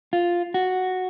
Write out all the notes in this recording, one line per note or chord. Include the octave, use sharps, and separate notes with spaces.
F4
F#4